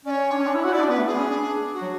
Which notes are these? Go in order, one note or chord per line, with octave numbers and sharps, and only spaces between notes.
C#4 D5
C#5
D4
C#4
D4
E4
F#4
E4 D5
D4
B3 B4
A3
B3 G#4
C#4
D4
F#4
F#3